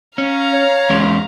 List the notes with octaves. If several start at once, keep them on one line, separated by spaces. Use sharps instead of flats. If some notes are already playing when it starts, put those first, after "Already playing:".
C#4 F5 A#5
C#5
E2 G#3 C#4